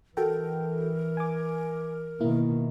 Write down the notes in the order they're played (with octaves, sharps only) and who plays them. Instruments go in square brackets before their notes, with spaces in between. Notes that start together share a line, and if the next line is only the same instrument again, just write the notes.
[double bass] E3 [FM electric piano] F#4 A4 G5 [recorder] A#4
[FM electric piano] G#5 D6
[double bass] B2 D#3 [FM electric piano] A#3 E4